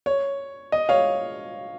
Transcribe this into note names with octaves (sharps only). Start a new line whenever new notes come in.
C#5
D#5
C#5 F5